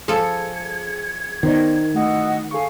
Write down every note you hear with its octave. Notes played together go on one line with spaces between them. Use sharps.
F3 G#4 A4 G#6 C#7
D#3 B3 C5 D5
A3 E4 F#4 D#5
G#4 A4 F5 C#6